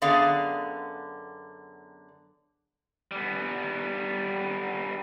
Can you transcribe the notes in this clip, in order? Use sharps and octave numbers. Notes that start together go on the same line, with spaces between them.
F#2 D3 B3 G#4 D5 F5
G3 B3